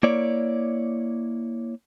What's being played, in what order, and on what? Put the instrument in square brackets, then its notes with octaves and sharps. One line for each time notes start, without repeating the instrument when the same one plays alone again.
[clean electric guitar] A#3 E4 C#5 D5